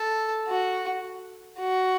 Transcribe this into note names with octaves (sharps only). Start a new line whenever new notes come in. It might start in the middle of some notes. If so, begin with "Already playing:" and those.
Already playing: A4
F#4
F#4